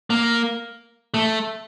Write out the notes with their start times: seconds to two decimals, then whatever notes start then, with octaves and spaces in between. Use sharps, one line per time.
0.10 A#3
1.14 A3